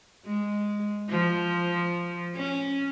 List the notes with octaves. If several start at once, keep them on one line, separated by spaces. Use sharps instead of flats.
G#3
F3
C#4